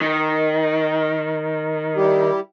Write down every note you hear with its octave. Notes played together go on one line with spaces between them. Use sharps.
D#3
G3 E4 G4